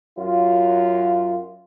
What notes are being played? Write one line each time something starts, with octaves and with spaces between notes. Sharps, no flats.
F#2 F#3 F4